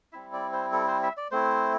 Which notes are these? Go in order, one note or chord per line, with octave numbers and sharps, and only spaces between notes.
G3 C4 E4 E5
D5
C5
A4
C5
E5
D5
A3 C4 E4 C5